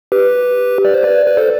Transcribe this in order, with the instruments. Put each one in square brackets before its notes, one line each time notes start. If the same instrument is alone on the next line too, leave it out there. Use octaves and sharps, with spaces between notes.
[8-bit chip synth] G4 B4
D5
C5
B4 D5
B4
A4 C5